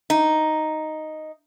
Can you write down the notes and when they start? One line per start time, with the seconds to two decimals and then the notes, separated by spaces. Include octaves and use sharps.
0.10 D#4